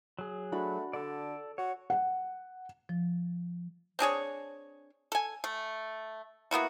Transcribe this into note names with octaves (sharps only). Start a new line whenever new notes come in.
F#3 G#4
A3 D4 F#4 B5
D3 A4 D5
F#4 C#5
F#5
F3
C4 D4 G#4 C#5
A4 G#5
A3
A#3 B3 E4 F#4